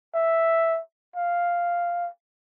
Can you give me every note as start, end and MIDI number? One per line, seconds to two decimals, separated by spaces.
0.15 0.80 76
1.16 2.09 77